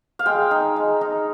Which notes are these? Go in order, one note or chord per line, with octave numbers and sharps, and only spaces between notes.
F5
G#3 G5
D#4
G#3
D#4